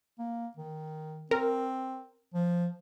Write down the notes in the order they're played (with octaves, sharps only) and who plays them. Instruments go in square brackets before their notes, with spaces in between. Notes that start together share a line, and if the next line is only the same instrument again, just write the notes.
[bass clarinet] A#3
D#3
[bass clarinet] C4 [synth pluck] A#4
[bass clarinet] F3